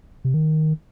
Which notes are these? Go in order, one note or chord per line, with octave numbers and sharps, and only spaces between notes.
C3
D#3